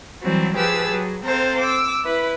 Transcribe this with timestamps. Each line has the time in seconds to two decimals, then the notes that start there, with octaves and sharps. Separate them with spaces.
0.22 E3 F#3 G3 C4
0.54 F3 G4 G#4 B4 A5 E6
0.87 F#3
1.24 C4 A4 C5 F5 A#5
1.60 D6 E6
2.05 E4 B4